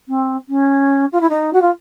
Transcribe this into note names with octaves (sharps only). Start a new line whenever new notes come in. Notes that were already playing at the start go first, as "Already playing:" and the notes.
C4
C#4
F4
E4
D#4
F#4
F4